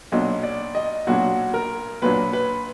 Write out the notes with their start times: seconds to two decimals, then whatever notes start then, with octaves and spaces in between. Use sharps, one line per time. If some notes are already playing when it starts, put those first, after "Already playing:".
0.12 B1 A#2 F#3 D4 D#5
0.43 D5
0.75 D#5
1.07 B1 A#2 F#3 D4 F#4
1.54 A#4
2.02 B1 A#2 F#3 D4 B4
2.33 B4